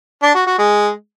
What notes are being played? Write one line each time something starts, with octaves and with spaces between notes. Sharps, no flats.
D4
F#4
F#4
G#3